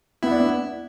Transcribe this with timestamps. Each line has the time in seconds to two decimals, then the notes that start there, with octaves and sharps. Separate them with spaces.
0.23 B3 E4
0.31 D4
0.40 B3